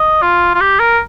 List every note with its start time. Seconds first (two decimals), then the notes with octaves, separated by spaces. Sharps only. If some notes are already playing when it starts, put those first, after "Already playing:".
Already playing: D#5
0.22 F4
0.55 F4
0.61 G4
0.80 A#4